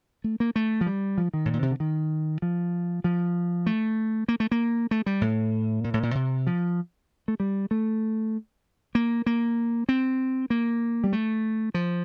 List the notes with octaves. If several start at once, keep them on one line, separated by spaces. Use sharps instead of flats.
A3
A#3
A3
F3
G3
F3
D#3
A2
A#2
C3
D3
D#3
F3
F3
A3
A#3
A3
A#3
A3
G3
A2
A#2
A2
A#2
C3
F3
A3
G3
A3
A#3
A#3
C4
A#3
G3
A3
F3